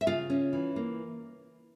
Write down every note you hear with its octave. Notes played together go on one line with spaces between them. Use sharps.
E5
C#3 F4 F5
C#4
E3
A#3